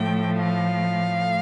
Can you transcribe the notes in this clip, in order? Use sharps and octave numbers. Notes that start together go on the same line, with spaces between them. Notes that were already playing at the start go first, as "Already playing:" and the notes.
Already playing: A2 F3 A3 G5
F5